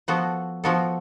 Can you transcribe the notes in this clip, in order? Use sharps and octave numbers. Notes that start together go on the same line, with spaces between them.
F3 B3 F#4 A4
F3 B3 F#4 A4